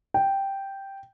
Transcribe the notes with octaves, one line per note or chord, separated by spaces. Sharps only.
G5